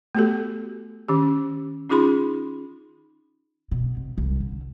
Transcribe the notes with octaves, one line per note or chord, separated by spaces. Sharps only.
A3 B3 F#4 G4 A4
D#3 C#4 G4
C#4 D#4 F4 G#4 B5 C6
B2
C3
C2
D3